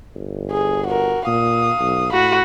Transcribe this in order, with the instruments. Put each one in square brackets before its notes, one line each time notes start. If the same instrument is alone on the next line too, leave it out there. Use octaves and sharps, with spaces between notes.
[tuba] G1
[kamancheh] G#4
F#4 A#4
[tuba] A#2 [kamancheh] F5 D#6
[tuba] B1
[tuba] A2 [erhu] F#4 [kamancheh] B5